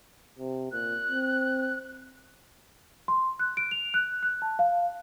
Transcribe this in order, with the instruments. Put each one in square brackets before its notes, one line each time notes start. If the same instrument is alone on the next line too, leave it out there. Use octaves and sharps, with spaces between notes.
[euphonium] C3
[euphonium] A#2 [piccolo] F#6
[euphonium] C4
[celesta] C6
F#6
D7
F7
F#6
F#6
A5
F5